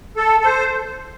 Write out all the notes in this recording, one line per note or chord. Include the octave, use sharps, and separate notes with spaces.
A4
A4
C5